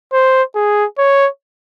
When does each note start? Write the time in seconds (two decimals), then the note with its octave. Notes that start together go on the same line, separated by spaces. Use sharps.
0.13 C5
0.55 G#4
0.98 C#5